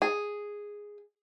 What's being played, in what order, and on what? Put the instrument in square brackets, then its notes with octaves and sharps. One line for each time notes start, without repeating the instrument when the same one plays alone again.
[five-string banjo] G#4